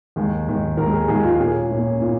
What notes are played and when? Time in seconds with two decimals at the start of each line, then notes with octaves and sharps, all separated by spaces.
0.16 D#2 D#3 G#3
0.48 D#2 D#3 G#3
0.77 D#2 D#3 G#3 A#4
0.93 G#4
1.08 D#2 D#3 G#3 G#4
1.24 F4
1.40 A#2 A#3 C#4 G#4
1.71 A#2 A#3 C#4
2.01 A#2 A#3